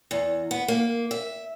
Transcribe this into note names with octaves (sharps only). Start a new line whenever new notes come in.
E2
B3
A#3
E5